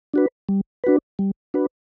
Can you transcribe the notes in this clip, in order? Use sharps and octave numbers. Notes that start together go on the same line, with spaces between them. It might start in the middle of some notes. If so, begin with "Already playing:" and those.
D4 F#4 B4
G3
D4 F#4 B4
G3
D4 F#4 B4